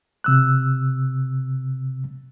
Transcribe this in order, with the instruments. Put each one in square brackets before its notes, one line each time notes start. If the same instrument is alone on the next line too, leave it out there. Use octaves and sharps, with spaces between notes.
[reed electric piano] C3 E6 F#6